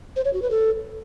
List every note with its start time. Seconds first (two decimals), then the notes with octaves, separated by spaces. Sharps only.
0.16 C5
0.25 C#5
0.33 F#4
0.42 B4
0.51 A4